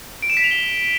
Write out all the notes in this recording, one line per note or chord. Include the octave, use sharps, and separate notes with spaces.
D7
E7
B6
F7
G7